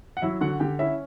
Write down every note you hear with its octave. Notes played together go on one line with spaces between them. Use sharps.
F#5
F#3 E4 E5
D3 F#4 F#5
D3 G4 G5
C#4 E4 E5